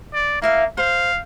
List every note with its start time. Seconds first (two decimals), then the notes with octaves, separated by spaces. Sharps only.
0.14 D5
0.42 A#3 E4 E5 F5
0.77 C5 F5